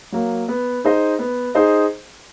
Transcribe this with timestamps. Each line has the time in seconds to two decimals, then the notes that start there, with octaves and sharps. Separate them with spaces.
0.12 F#3 A#3
0.48 B3
0.85 D#4 G#4 C5 D#5
1.19 B3
1.55 D#4 G#4 C5 D#5